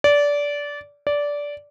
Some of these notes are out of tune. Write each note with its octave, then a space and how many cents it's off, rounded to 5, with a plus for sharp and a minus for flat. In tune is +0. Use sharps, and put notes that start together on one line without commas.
D5 -20
D5 -15